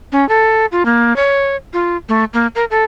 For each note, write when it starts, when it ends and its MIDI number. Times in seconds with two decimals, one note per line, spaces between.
0.12 0.27 61
0.29 0.66 69
0.72 0.85 65
0.85 1.16 58
1.16 1.56 73
1.73 1.97 65
2.09 2.24 57
2.34 2.47 58
2.55 2.65 70
2.70 2.84 69